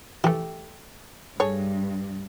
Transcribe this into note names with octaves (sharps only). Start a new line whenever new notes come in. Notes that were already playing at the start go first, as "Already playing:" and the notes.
E3 A3 G4
G2 A3 G#4 C#5